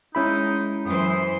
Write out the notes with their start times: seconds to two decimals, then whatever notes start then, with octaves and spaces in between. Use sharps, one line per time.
0.15 G#3 C#4 D#4 E4 B5
0.86 F#2 E3 C5 D#6